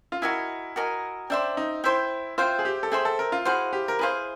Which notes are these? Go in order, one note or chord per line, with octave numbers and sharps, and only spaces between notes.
F4
E4 F#4 A#4 D#5 G#5
F#4 A#4 D#5 G#5
D4 C5 E5 G5
D#4
E4 C5 E5 G5
F4 C5 E5 G5
G#4
G4
A4
G#4 C5 E5 G5
A4
A#4
F4
E4 F#4 G#4 C5 F5
G4
A#4
E4 G#4 B4 C5 F5